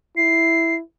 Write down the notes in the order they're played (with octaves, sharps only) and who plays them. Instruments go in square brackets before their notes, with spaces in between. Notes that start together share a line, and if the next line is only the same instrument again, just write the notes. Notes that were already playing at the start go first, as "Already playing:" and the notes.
[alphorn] E4 [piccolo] C7